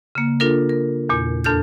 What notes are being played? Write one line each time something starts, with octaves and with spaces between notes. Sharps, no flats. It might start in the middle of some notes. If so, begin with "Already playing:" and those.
C#3 A#3
D4 F4 A4 A#4
A#4
E2 A#2
F2 D4 A4 F6 G6